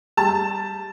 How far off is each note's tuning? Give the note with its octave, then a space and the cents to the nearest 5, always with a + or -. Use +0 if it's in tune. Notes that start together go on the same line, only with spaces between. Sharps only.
G3 +0 A5 +0